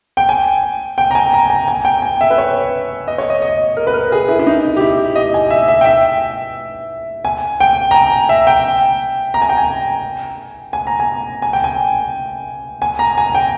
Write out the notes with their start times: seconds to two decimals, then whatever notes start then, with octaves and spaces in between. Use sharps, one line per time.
0.17 G5
0.29 G#5
0.98 G5
1.11 A#5
1.15 G#5
1.34 A#5
1.50 G#5
1.68 G#5
1.85 G5
2.02 G#5
2.21 E5
2.30 B4
2.38 C#5
3.08 D#5
3.18 C#5
3.30 D#5
3.42 D#5
3.77 A#4
3.87 B4
3.94 A#4
4.12 G#4
4.28 E4
4.39 E4
4.47 D#4
4.77 G4
4.81 E4
5.16 D#5
5.34 G#5
5.50 E5
5.68 E5
5.81 G5
5.85 E5
7.25 G#5
7.60 G5
7.91 A#5
7.95 G#5
8.29 E5
8.47 G5
9.34 A#5
9.42 G#5
9.49 G5
9.58 G#5
10.73 G#5
10.87 A#5
11.00 G#5
11.42 G#5
11.53 G5
11.64 G#5
12.82 G#5
12.99 A#5
13.18 G#5
13.35 G5